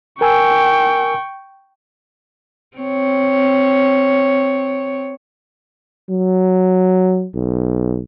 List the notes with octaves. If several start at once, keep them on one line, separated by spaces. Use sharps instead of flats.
A#4 G5 G#5 C#6 E6
C4 C#5
F#3
B1